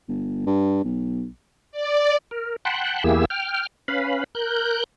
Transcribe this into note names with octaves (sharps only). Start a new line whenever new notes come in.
G1
G2
B1
D5
A#4
F#5 G5 A5 B5 C6 F#6
E2 A#3 E4 G4 G#4 E6
G5 F6
C#4 B4 F5 B5
A#4 F#6 G6